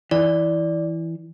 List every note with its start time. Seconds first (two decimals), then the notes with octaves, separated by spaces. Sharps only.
0.11 E3 D5